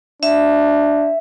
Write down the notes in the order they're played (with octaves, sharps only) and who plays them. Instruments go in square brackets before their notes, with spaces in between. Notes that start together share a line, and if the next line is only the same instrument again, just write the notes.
[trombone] D4 [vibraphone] E5